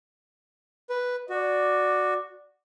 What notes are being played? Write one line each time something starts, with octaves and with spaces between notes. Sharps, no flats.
B4
F#4 D5